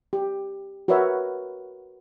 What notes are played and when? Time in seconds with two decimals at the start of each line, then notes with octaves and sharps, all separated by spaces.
0.13 G4
0.88 F#4 A#4 B4 C#5 E5